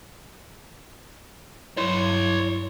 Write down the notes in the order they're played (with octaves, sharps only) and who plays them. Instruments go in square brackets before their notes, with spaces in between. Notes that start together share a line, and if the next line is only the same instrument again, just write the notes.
[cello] G2 F#3 [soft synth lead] E4 [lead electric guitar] C#5 C6